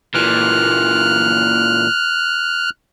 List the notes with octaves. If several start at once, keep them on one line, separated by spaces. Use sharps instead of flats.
A#2 E3 F6 F#6